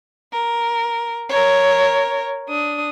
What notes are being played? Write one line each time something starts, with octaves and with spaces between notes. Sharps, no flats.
A#4
A#4 C#5
D4 D#6